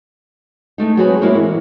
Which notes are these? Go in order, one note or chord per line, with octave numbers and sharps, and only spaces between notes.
G#3 A3 D#4
F#3 C4 F#4 G#4 B4 C#5
G#3 A#3 E4 F#4 A#4 C#5
E3